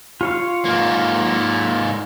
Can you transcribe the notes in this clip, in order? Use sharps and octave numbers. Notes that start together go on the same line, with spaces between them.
F4 C#5 F5
G#2 A#3